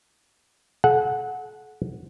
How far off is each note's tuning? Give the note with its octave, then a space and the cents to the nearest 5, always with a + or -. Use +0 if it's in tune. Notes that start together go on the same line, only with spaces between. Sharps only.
A4 -45 F#5 -10